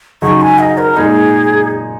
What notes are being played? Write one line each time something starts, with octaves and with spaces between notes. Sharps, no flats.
C#3 F#3 D#4 C#6
G#5
D#5
A#4
A#2 G#3 D#4 G#4